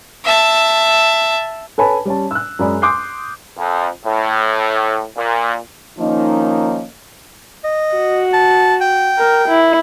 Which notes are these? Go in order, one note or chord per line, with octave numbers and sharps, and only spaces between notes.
E5 A5
A4 B4 C#5 G#5 A5 B5
G3 C#4 A5
E6 F#6
F#2 G#3 G#4 D5 B5
C6 D6 D#6 F#6 G6 C7
F2
A2
A#2
D#3 F3 A#3 C#4 D#4
D#5
F#4
A5
G5
A#4
E4